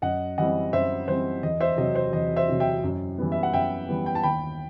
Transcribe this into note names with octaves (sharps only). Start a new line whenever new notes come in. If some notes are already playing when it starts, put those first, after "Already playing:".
F#2 D#5 F#5
E3 G3 C4 D#5 F#5
F#2 C5 E5
E3 G3 C4 C5
E2 D#5
C5 E5
C3 F#3 C4 D#5
C5
E2 D#5
C5 E5
C3 F#3 C4
E5 G5
F#2
E3 G3 B3
E5
F#5
F#2 E5 G5
E3 G3 B3
G5
A5
D#2 G5 B5